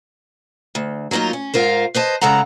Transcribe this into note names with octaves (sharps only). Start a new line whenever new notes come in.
D2
F#3 A#3 B3 D#4 F4
C#4
G#2 F4 A#4 C5
B4 C5 D#5 A5
C#3 G#3 A4 F#5 A#5